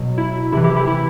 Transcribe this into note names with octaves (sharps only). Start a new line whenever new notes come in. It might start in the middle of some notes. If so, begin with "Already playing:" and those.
Already playing: B2 F#3
E4
C3 E3 E4
E4 G4
E4 G4
E4